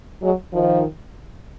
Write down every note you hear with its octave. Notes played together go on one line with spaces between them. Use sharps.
F#3 G#3
D#3 F3